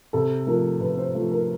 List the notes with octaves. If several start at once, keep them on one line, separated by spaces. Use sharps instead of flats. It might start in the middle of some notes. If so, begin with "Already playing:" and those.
C3 A4
F3 A3 A#4
C3 B4
C5
F3 A3
A#4